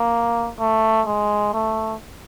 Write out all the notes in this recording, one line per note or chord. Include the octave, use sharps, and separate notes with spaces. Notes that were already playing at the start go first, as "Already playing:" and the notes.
Already playing: A#3
A3
G#3
A3